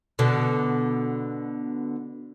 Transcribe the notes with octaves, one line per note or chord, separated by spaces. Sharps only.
B2 D3